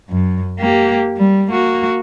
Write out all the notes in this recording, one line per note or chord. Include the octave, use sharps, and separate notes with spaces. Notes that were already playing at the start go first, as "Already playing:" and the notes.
F#2
A#3 G4
G3
A#3 F#4